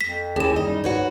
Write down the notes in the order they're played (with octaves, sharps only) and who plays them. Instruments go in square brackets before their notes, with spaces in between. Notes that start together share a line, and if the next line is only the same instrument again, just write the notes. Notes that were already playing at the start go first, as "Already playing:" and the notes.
[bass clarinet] F2 [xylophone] B6
[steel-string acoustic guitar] D#2 [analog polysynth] C#4 E4 [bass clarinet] G4 [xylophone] G#4 E7
[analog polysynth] F#2 D#4 [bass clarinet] G3 [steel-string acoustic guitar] D#5
[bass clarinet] G#2 [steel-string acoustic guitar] F#4 B4 C#5